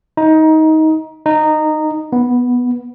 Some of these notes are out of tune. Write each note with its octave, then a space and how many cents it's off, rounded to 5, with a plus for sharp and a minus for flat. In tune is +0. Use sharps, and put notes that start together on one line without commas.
D#4 +20
D#4 -15
B3 -5